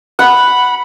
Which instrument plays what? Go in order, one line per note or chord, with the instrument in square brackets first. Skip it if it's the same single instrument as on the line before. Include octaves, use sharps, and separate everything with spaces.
[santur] F#5 [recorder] B5